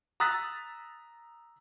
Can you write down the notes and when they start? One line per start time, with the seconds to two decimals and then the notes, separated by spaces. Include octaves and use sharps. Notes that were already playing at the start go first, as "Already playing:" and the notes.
0.20 A#5 D#6 E6 F#6 A6 B6